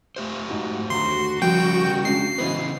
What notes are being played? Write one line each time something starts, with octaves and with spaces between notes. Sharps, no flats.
A3 G4 C5
G#2 D#4 F#4
D#2 D3 F#4 A#5 C6
C#3 F3 G3 A#3 G5
G#3 C#4 D4 C7
C#3 E3 B3 B4 C5 D#5